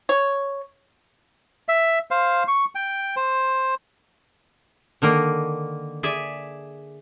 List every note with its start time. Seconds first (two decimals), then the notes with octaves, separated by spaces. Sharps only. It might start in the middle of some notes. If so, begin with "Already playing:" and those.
0.09 C#5
1.68 E5
2.11 C5 F5
2.48 C#6
2.75 G5
3.16 C5
5.02 D3 D#3 A#3
6.03 G#4 D5 E5